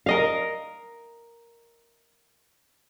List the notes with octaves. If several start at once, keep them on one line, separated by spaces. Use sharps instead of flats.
A#4 D#5 F5